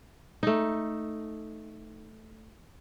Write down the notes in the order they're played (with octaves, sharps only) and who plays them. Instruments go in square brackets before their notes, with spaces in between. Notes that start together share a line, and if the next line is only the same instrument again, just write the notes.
[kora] A3 D#4